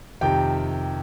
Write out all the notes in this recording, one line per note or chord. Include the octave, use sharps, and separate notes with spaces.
F2 C3 D#3 G4 G5